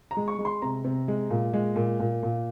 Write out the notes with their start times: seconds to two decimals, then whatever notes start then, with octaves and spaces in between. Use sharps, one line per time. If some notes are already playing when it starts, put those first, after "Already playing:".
0.11 A#5
0.17 G#3
0.28 C#6
0.39 G#3
0.45 C6
0.62 C3 A#5
0.84 C3
1.08 G#3
1.30 A#2
1.53 G#3
1.76 A#2
2.00 A#2
2.23 A#2